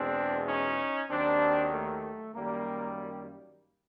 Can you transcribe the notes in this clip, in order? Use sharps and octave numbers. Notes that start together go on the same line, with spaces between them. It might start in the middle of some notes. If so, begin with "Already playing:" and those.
Already playing: E2 B2 G#3 C4 D4
C#4 D#4
D#2 D#3 F#3 C4 D4
A3
F#2 D#3 G3 A#3
A#3